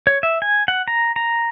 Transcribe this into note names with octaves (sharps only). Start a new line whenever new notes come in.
C#5
E5
G#5
F#5
A#5
A#5